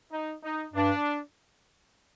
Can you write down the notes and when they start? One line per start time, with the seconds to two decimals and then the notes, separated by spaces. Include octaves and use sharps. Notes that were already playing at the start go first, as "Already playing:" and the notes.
0.12 D#4
0.43 D#4
0.73 G2 D4